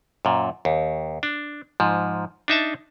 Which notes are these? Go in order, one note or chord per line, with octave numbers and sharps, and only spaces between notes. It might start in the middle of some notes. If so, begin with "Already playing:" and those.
F#2 A#2
D#2
D4
G#2 F3
D4 D#4 E5 A5